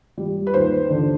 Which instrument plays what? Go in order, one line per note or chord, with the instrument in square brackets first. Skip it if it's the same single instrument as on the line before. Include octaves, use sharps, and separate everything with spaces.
[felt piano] G3
B4
D#2 C5
D3